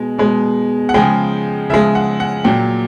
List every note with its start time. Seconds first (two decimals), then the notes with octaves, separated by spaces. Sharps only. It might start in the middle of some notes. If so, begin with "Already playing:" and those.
Already playing: B2 G#3
0.18 B2 G#3
0.89 F#5
0.94 C#3 F3 G#3 G5
1.69 C#3 F3 G#3 E5
1.95 F#5
2.20 F#5
2.44 A#2 F#3 G5